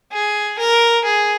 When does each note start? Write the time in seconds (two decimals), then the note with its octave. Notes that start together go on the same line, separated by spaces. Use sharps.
0.12 G#4
0.59 A#4
1.05 G#4